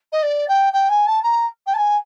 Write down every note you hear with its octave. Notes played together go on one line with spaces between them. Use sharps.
D#5
D5
G5
G5
G#5
A5
A#5
G5
A5
G#5